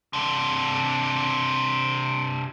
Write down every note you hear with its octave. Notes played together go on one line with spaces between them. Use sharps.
C3 D4